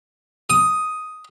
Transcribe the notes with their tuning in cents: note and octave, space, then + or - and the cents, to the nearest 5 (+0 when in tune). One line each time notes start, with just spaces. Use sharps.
D#6 +5